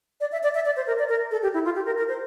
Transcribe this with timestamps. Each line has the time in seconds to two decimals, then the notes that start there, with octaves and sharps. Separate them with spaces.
0.20 D5
0.32 E5
0.43 D5
0.55 E5
0.66 D5
0.77 C5
0.87 A#4
0.99 D5
1.09 A#4
1.31 A4
1.43 G4
1.54 E4
1.65 F4
1.75 G4
1.86 A#4
1.98 A#4
2.09 C5